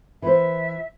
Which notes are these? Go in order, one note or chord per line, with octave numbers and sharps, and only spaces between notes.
E3 C5 E5